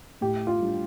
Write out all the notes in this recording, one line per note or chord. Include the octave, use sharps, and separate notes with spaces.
A2 G4
F4
G3 D4